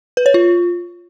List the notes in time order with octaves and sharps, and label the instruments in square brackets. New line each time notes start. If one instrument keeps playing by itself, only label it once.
[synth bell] B4
C#5
F4